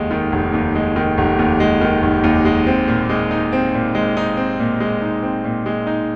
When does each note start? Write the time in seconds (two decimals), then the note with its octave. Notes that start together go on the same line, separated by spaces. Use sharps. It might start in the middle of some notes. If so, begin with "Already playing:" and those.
Already playing: F1 D#2 D#3 G#3
0.11 D#3
0.32 F1
0.54 D#2
0.75 G#3
0.96 D#3
1.17 F1
1.39 D#2
1.60 G#3
1.81 D#3
2.02 F1
2.24 D#2
2.45 G#3
2.67 C4
2.88 A#2
3.09 G#3
3.31 D#4
3.52 C4
3.74 A#2
3.95 G#3
4.17 D#4
4.37 C4
4.59 A#2
4.80 G#3
5.02 D#4
5.23 C4
5.44 A#2
5.66 G#3
5.87 D#4